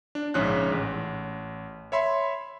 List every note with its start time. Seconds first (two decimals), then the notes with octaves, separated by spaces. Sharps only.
0.15 D4
0.34 A#1 G#2 C#3 C#4 C#5 F#6
0.72 A1
1.92 C#5 E5 B5 C6